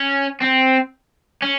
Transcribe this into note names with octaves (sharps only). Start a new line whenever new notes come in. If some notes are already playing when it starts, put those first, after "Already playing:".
Already playing: C#4
C4
C#4